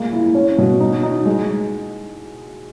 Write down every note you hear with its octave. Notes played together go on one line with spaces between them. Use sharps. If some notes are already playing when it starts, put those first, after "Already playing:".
Already playing: A#2 G#3 A#3
E4
C#4
B2
D#4
D#4
G#3